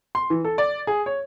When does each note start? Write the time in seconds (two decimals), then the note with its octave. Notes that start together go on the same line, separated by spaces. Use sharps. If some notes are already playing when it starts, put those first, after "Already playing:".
0.15 C6
0.30 E3
0.45 A4
0.58 D5
0.87 G#4
1.06 C#5